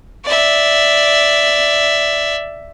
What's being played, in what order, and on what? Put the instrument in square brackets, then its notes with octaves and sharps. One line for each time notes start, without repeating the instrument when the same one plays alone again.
[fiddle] D5 E5